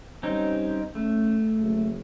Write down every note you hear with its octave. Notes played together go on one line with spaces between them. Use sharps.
G3 C4 C#4 D#4
A3 C#4
F#1